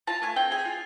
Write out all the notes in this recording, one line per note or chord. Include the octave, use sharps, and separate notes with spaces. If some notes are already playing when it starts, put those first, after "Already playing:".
F4 A5
A3 G#5
C4 G5
G#4 G#5
F4